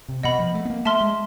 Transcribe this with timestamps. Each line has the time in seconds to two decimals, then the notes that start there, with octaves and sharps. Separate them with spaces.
0.08 C3
0.23 B2 D#5 F#5 B5
0.39 F3
0.54 A3
0.65 B3
0.70 A#3
0.85 A3 E5 A5 C6 F6
1.01 G#3